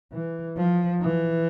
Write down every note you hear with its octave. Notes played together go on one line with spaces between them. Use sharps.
E3
F3
E3